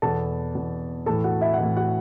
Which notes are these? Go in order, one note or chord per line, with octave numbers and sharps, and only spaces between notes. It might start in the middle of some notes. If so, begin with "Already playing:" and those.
E2 B2 A4 A5
E2 B2
A2 E3 A4 A5
F#4 F#5
E4 E5
F#5
A2 E3 E4 E5
F#4 F#5